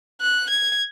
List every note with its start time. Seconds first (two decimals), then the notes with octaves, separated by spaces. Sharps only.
0.21 F#6
0.50 G#6